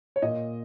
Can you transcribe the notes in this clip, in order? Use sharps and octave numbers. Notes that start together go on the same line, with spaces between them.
C#5
A#2 D#5